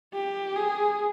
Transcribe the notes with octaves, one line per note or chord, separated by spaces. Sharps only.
G4
G#4